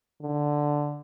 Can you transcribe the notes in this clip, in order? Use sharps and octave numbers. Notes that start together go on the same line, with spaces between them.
D3